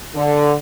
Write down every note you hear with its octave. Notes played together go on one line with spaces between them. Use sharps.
D3